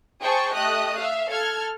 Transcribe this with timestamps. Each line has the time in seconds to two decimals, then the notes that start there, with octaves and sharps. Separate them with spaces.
0.22 G#4 C5 G5 A5 C#6
0.54 A3 G4 D#5 D#6 F#6
0.99 E5 F5
1.31 A4 F6 G#6